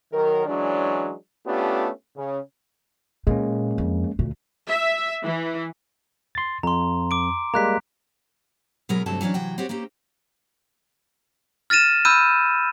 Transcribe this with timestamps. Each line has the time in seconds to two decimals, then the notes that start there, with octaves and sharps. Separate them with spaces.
0.13 D#3 F#3 A#4
0.46 E3 F#3 G#3 C#4 D4
1.46 A3 B3 C#4 D4 F4 G4
2.16 C#3
3.27 A#2 G#3 A#3 C#4
3.78 F2
4.19 D2 A#2
4.68 E5
5.23 E3
6.35 C6 A6
6.63 F2 A#5 C6
7.11 D6 D7
7.54 G3 G#3 A#3 A#5 F#6 B6
8.89 B2 F#3 G#3 C#4 A#4 B4
9.06 D2 G2 C3 F#3 A3 A5
9.21 E3 F#3 A#3 C#4 D4
9.34 C3 E3 F#3 F#4 G5
9.58 C4 F#4 G4 C#5
9.69 A#3 C4 C#4 G4
11.70 F6 A6 A#6 D#7 E7
12.05 B5 E6 F6 G6 D#7